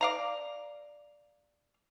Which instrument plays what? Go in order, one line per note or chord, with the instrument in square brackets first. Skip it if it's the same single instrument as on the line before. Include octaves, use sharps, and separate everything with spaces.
[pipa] D5 F5 A#5